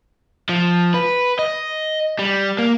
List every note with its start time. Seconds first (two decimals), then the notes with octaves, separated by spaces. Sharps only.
0.49 F3
0.94 B4
1.39 D#5
2.19 G3
2.59 A#3